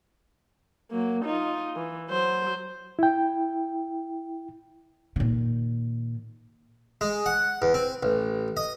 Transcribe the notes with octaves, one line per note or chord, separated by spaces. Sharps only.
F#3 A#3
D#4 F4
E3
F#3 C5
E4 G5
A#2 D#3
G#3
F#5
E2
C4
A1
D#5